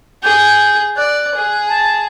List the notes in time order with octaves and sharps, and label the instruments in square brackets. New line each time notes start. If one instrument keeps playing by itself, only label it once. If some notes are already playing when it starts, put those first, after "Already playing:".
[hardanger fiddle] G#4 [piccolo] G6
[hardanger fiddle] D5 [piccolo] F#6
[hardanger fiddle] G#4
[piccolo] A5